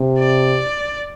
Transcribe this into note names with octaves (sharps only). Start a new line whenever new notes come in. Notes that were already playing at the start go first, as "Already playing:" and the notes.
Already playing: C3
D5